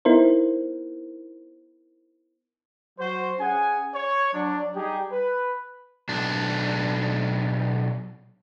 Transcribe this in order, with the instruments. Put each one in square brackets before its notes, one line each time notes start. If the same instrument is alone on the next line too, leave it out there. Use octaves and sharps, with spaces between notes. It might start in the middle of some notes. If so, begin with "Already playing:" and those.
[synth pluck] B3 D#4 E4 A#4 C5
[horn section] F#3 F#4 C5
C#4 G#4 F#5 G#5
C#5
F#3 D4
G3 D#4 G4 G#4
B4
[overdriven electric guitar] B1 D4